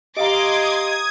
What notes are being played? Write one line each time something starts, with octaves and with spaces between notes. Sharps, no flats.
G4 D#5 F5 A#5 C6 D6 D#6 G#6